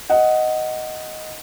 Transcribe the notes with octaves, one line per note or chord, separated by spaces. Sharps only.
D#5 F#5